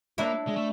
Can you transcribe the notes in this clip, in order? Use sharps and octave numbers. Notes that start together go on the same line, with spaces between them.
A#3 D4 E4
G#3
A3